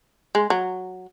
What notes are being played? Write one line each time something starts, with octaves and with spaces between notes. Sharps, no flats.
G#3
F#3